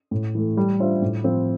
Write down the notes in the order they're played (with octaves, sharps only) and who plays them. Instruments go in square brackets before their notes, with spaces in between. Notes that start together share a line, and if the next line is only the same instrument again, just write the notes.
[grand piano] A2
E3 A3
G3
D4 F4 C5 E5
A2
F3 C4